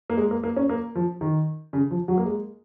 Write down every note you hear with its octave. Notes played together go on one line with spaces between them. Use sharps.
A#3
G#3
A#3
A#3
C#4
A#3
F3
D#3
C#3
F3
F#3
A#3
G#3